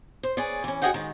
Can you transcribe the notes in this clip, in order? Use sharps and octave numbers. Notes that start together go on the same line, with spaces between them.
C5
G#4 B4 C#5 D5
E3 C#4
F#4 G#4 C#5 D#5 F#5 G5
D#3 G#3